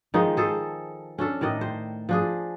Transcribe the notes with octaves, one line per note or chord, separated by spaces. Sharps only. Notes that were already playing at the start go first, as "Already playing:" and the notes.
D#3 F3 G#3 D#4
G#4 A4 C5
C#4 D4 A4
A2 D#3 D5 D#5
C5
F3 D4 G#4